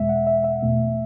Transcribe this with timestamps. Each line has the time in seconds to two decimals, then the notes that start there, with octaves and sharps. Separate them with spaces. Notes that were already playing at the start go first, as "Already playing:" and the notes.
Already playing: E2 B2 G#3 E5
0.09 F#5
0.27 E5
0.44 E5
0.62 E2 B2 A3